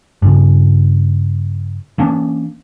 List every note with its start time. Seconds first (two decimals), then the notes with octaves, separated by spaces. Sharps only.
0.22 G2 C#3
1.98 E3 A#3 C#4 D4